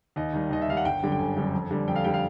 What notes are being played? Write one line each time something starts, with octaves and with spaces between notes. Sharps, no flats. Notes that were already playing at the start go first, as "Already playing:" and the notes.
D#2 D#5
D#3 G3
D#2 D#5
E5
D#3 G3 F5
F#5
G1 G5
F#2 D3 G3
G5
G1 G#5
F#2 D3 G3
F2
D3 G3
F2 G5
F5
D3 G3 G5
F5